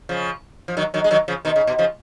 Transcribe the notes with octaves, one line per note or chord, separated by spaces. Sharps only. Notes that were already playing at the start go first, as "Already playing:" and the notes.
C#3 F3
F3
D#3 F#3
D#3 F#3
G#3
D#3 F#3
C#3 F3
B2 D#3
C#3
B2
C#3 F3